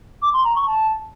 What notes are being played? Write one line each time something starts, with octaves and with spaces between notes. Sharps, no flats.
D6
C6
A#5
C#6
A5